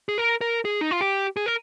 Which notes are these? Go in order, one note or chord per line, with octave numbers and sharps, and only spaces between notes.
G#4
A#4
A#4
G#4
D#4
F4
G4
G#4
A#4